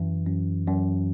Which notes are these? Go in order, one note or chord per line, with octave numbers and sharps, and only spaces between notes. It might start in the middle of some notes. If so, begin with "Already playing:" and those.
Already playing: F#2 E3
F#2
F#2